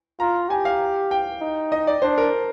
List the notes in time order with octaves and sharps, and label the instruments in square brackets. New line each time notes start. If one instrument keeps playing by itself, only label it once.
[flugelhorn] F4 [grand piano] A#5
[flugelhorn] G4 [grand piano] G#5
[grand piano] F5
G5
[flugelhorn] D#4
[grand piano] D#5
D5
[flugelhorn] D4 [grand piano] C5
[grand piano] A#4